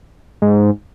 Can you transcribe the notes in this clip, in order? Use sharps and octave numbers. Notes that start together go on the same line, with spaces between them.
G#2